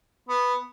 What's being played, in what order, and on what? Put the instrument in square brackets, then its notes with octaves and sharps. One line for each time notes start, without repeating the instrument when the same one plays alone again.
[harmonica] B3